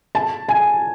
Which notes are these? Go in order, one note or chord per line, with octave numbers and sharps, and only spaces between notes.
A5
G#5